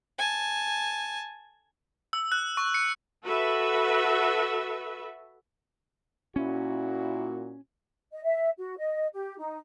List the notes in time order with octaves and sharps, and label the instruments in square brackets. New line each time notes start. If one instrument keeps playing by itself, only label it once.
[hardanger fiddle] G#5 A5
[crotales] E6
F#6
C#6
C#7
[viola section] F#4 A4 B4 E5
[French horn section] A#2 E4 F#4 [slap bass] C#4
[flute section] D#5
E5
F#4
D#5
G4
D#4